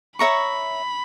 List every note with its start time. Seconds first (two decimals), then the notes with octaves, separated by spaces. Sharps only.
0.19 C#5 E5 A#5 B5 C#6